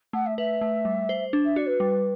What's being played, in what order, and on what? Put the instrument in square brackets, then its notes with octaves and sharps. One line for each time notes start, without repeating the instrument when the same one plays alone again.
[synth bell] A3 [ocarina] F#5
[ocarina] E5
[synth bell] B4 [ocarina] E5
[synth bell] A3
G3
C5
D4
[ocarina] E5
[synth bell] F#4 [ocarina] D5
[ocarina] B4
[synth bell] G3